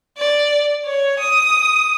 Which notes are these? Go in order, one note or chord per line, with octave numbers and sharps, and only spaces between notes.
D5
C#5
D#6